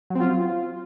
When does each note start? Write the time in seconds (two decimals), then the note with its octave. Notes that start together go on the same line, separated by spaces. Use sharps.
0.10 F#3
0.15 C4
0.20 F4